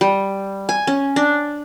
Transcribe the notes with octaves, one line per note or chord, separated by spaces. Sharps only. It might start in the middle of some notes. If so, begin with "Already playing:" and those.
G3
G#5
C#4
D4